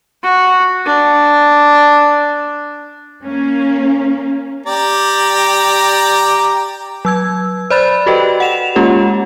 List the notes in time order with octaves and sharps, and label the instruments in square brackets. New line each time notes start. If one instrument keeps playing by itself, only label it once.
[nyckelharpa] F#4
D4
[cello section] A#3 C#4
[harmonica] G4 D5 A#5
[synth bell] F#3 E6 G#6
C5 D5 B5 F#6 A6
F#4 G4 A4 B4 D#5 G5
F#5 E7 F7
G#3 A#3 C#4 F4 G4 A4